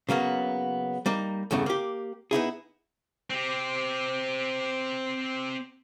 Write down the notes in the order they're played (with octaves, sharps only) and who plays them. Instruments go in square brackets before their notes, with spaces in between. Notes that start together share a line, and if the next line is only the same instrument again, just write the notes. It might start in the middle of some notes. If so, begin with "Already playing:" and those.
[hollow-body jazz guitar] C#3 F#3 A#3 B3
G3 A#3 D#4
E2 G2 C#3 A3
A#3 G4
B3 D#4 E4 G#4
[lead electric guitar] C4 G4